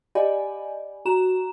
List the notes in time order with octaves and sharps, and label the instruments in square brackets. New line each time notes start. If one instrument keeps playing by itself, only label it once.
[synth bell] G4 D5 D#5 F#5 G#5 B5
F#4 A#5 E7